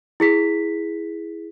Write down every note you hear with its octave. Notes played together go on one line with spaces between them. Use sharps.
E4 G#4 B6